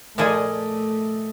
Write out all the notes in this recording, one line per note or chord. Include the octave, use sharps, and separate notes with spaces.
A#2 F3 A3 G#4 D5 D#5 G#5